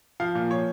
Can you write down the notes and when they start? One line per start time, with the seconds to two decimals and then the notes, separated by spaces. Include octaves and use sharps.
0.20 F3 F5
0.35 A#2
0.50 F3 C#5